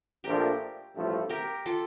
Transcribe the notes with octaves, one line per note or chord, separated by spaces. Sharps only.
A#1 A#2 F3 A3 D4 G4 A#4
A1 G2 F3 A3
G4 A#4
F4 A4